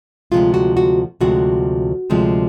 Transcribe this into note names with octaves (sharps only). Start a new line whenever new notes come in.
D2 C3 F3 G#3 F4
F#4
F#4
D2 C3 F3 G#3 F#4
D2 C3 F3 G#3